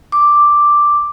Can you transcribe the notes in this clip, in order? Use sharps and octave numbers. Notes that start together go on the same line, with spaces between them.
D6